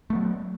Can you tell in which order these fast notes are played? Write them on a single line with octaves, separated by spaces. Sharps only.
A3 B3 F#3